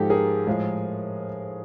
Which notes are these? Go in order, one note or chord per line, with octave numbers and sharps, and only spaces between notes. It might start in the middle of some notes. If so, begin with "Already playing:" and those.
Already playing: G#2 F3 G#3 G4 A4
G#4 A#4
A2 F3 G#3